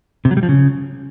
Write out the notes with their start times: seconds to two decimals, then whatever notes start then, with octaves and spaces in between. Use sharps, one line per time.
0.25 C3
0.31 F#3
0.37 G3
0.43 F3
0.49 C#3